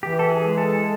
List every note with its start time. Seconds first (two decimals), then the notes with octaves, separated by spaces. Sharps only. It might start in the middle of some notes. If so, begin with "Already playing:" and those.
0.03 E3 G4
0.19 A4
0.30 G#4
0.44 G#3
0.58 A4